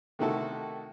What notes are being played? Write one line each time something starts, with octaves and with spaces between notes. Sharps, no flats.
C3 D#3 A3 E4 F#4 A4